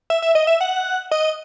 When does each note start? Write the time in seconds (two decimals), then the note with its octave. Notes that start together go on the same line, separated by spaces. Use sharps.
0.10 E5
0.22 E5
0.35 D#5
0.47 E5
0.61 F#5
1.11 D#5